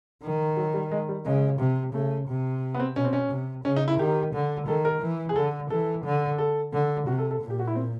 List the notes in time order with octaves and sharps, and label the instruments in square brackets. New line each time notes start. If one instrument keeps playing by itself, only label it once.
[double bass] D#3
[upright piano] F#3
G3
G#3
G3
[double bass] C#3 [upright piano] G#3
[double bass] C3
[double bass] C#3 [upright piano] A3
[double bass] C3
[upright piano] B3
C4
[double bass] B2 [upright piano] C#4
[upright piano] C4
C#4
[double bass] C3
[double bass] C#3 [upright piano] C#4
[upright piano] D#4
E4
[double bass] D#3 [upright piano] G4
[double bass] D3
[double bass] D#3 [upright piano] A4
[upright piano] A#4
[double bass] E3
[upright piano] G#4
[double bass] D3 [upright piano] A4
[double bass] E3 [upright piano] A4
[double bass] D3
[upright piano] A4
[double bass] D3
[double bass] C3 [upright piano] F#4
[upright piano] A4
A4
[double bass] A#2
[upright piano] G4
F#4
E4
C4